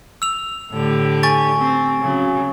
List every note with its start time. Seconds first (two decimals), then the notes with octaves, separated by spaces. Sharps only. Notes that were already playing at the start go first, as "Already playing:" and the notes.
0.22 E6 F7
0.72 A2 D3 G4
1.23 G#5 C#6 A6
1.59 C4
2.00 C#3 F#3